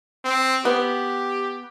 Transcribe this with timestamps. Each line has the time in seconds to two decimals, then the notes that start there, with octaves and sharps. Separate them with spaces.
0.25 C4
0.65 B3 G4